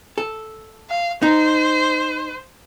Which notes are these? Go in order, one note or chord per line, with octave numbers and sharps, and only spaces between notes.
A4
F5
D#4 C5